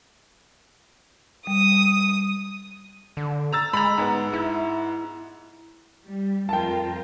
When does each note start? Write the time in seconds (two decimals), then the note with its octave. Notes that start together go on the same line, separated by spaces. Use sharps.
1.47 G3 D#6
3.17 D3
3.53 A#5 E6 A6
3.73 G#3 A#5 B5
3.98 G#2 B3
4.33 E4
6.04 G3
6.49 F2 F4 A#4 G5 A5